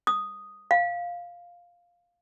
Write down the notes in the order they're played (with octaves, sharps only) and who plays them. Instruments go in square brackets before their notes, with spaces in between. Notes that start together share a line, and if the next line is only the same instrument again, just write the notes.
[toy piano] D#6
F5